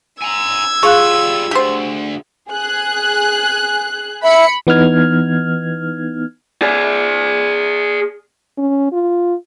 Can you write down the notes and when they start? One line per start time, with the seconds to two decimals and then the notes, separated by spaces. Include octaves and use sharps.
0.22 G#5 A#5 E6 G#6
0.83 G3 F4 G#4 F5 C#6 F#6
1.51 D2 G4 C5
2.50 G#4 F#6
4.23 E5 B5 C#7
4.67 E3 B3 D#4 F6 G#6
6.62 G#4 D5
8.58 C#4
8.93 F4